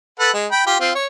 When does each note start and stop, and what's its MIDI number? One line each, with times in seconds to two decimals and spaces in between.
0.20 0.30 69
0.20 0.30 71
0.20 0.30 78
0.34 0.47 56
0.51 0.63 79
0.51 0.63 83
0.67 0.78 65
0.67 0.78 67
0.80 0.92 60
0.80 0.92 65
0.95 1.07 73